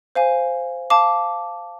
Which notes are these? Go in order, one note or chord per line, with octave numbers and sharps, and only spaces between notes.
C5 F5 G#5
F5 A5 D6